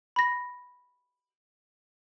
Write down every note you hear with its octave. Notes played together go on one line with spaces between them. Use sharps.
B5 A#6